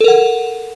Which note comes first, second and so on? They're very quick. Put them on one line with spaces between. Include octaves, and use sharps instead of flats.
A4 A#4 F#5